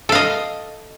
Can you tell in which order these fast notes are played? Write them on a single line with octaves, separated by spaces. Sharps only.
A4 F5 D#5